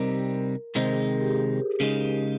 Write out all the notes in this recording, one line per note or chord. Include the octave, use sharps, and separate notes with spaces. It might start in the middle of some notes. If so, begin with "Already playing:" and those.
Already playing: C3 G3 C4 D#4 A#4
C3 D#3 G#3 C4 D#4 C5
A#4
G#4
A#4
G4
G#4
C#3 G#3 D#4